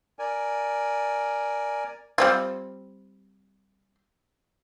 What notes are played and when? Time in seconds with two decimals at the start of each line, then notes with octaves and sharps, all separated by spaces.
0.19 A#4 D5 G#5
2.18 G3 C4 F4